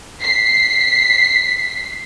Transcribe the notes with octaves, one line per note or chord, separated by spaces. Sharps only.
B6 C7